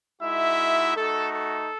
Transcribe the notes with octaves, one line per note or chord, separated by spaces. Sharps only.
G#3 D#4 E4 F#4 E5
A3 D#4 F#4 A4
A4